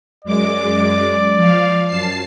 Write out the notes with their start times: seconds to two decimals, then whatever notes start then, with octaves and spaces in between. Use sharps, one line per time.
0.24 F#2 G#3 D5 D6
1.37 F3 F5
1.87 F#2 A5 C7